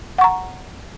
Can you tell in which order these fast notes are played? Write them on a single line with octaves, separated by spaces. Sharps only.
F#5 C#6 A#5